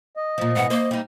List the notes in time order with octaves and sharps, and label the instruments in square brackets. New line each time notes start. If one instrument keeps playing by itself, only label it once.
[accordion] D#5
[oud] A#2 F3
[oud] G#2 B2 E3 [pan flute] F#5
[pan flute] A#3 [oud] C5
[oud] G3 D#4